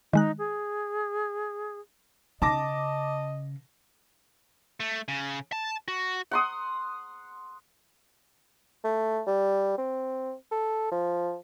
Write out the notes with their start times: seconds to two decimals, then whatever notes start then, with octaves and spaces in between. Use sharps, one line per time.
0.13 D#3 G#3 D#4 F#6
0.38 G#4
2.42 C#3 D#5 A5 D6 A#6
4.80 A3
5.08 C#3
5.52 A5
5.88 F#4
6.31 F#5 C6 D#6
8.84 A3
9.27 G3
9.78 C4
10.51 A4
10.91 F3